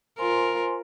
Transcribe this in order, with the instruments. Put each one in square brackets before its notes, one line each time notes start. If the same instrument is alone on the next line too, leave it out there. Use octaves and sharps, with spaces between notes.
[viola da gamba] F4 A#4 [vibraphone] C5 G#5 C6